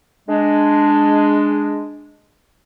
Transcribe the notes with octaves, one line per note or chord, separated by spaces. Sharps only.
G#3 D4